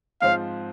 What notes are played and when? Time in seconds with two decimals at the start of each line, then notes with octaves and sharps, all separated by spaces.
0.22 G#2 F3 C4 F4 C5 F5